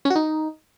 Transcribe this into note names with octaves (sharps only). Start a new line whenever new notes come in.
C#4
F#4
D#4